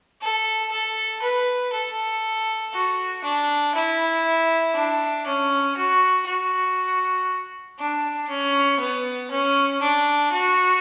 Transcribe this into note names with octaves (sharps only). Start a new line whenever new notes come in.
A4
A4
B4
A4
F#4
D4
E4
D4
C#4
F#4
F#4
D4
C#4
B3
C#4
D4
F#4